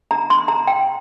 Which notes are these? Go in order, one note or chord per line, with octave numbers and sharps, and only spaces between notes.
A#5
C6
A#5
G5